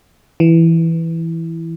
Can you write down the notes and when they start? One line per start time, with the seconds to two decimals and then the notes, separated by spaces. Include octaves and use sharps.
0.40 E3